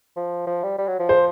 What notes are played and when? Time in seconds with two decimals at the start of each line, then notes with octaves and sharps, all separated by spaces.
0.16 F3
0.47 F3
0.63 G3
0.78 G3
0.88 F#3
0.99 F3
1.09 C5